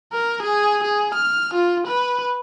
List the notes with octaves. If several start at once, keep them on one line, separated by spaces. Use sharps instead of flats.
A#4
G#4
G#4
F6
F4
B4